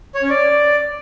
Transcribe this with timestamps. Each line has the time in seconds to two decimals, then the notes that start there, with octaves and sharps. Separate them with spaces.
0.15 C#5
0.22 C#4
0.30 D5